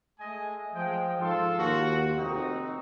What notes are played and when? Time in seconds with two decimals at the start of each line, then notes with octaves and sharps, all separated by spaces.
0.19 G#3 A3 D#5 G#5
0.74 F3 G#3 G5
1.20 G#2 F4 A4 C6
1.58 D#2 F#4
2.16 F1 C4 D#4 F#4